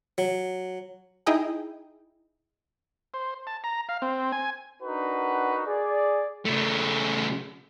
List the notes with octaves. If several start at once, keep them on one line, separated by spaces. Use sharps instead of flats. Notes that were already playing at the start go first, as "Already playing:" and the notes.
F#3
D#4 E4 G#4 D#5 G5 G#5
C5
A5
A#5
F5
C4
G#5
D4 D#4 F#4 A#4 B4 F#5
G#4 D5
C#3 A3